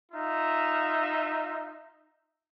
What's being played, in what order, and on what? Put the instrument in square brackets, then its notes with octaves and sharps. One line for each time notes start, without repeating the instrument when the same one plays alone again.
[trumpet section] D#4 F4 E5